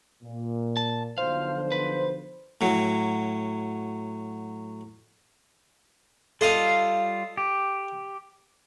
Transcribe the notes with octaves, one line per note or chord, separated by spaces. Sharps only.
A#2
A5
B1 D3 F3 C5 F5
B4
A2 F#3
G3 F4 A4 D#5 F5
G4